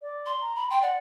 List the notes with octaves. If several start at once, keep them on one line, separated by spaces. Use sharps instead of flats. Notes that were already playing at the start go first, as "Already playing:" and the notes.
D5
C6
A#5
B5
G5 C6
D5 F#5